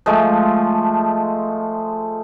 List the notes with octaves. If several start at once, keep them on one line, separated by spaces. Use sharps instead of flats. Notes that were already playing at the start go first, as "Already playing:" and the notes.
F3 G#3 A3